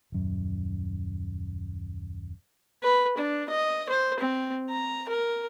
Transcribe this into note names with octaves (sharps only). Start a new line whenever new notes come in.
D#1 F#2
B4
D4
D#5
C5
C4
A#5
A#4